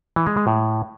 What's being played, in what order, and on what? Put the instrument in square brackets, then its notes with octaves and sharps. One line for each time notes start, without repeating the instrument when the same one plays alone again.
[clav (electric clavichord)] E3
G#3
G#3
A2